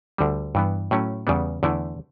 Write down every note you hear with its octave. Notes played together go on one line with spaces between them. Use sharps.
D2 D3 G3
G2 E3 B3
A2 F#3 A3 C#4
E2 C#3 G3 B3
E2 D3 A3 E4